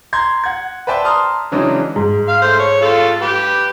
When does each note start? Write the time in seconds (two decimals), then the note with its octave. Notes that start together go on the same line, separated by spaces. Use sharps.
0.13 A#5 C6 G#6
0.44 F#5 G#6
0.87 B4 C5 D5 E5 G5 A5
1.05 A5 A#5 C6 D#6 F6
1.52 C#3 E3 F#3 G#3 D4 D#4
1.96 G#2
2.28 F5
2.42 A3 C5
2.59 C#5
2.82 F4 A4
3.22 G4 B4